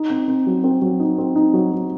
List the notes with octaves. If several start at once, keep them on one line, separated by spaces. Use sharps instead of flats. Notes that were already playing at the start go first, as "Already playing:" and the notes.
Already playing: D#4
C4
C4
F#3
C4
F#3
D#4
C4
D#4
F#3
F#3